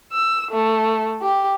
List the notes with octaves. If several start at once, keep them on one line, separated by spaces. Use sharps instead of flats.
E6
A3
G4